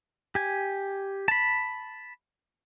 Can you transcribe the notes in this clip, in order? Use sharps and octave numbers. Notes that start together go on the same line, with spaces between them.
G4 G#5
A5 B5